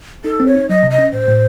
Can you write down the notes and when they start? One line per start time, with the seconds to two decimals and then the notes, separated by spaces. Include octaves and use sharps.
0.25 D#4 A4
0.40 C4
0.47 C#5
0.55 D#4
0.69 F#3 D#5
0.83 C3
0.90 D#5
0.98 C#4
1.12 A2 C5
1.28 A2